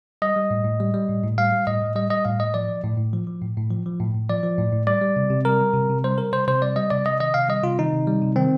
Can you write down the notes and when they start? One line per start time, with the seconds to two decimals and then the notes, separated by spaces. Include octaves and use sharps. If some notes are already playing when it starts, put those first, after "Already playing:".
0.22 G3 D#5
0.36 G3
0.51 A2
0.65 A2
0.80 G3
0.94 G3
1.09 A2
1.23 A2
1.38 G3 F5
1.52 G3
1.67 A2 D#5
1.81 A2
1.96 G3 D#5
2.10 G3 D#5
2.25 A2 F5
2.40 A2 D#5
2.54 F3 D5
2.69 F3
2.84 A2
2.98 A2
3.13 F3
3.27 F3
3.42 A2
3.57 A2
3.70 F3
3.86 F3
4.00 A2
4.14 A2
4.29 F3 D5
4.43 F3
4.58 A2
4.72 A2
4.87 G3 D5
5.02 G3
5.16 C3
5.30 C3
5.45 G3 A#4
5.60 G3
5.74 C3
5.89 C3
6.04 G3 C5
6.18 G3 A#4
6.33 C3 C5
6.47 C3 C5
6.61 G3 D5
6.76 G3 D#5
6.90 C3 D5
7.05 C3 D#5
7.20 D#3 D#5
7.34 C3 F5
7.49 G3 D#5
7.63 C3 F4
7.79 D#3 D#4
7.93 C3
8.07 G3
8.22 C3
8.36 D#3 C4